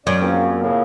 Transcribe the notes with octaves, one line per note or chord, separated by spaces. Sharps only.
F#2 C#4 D5
E2 F3 A#3 C4 C#4 G#4
A2 C#3